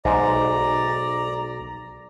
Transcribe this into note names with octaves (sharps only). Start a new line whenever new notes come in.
B1 G#2 D5 A#5